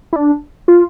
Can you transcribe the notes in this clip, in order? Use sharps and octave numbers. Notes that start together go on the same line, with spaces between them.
E4
D4
F4